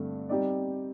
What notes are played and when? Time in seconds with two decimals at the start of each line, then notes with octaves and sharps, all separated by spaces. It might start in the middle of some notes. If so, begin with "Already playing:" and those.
Already playing: G2 D3 A3 C4
0.29 G3 C4 D#4 G4 D5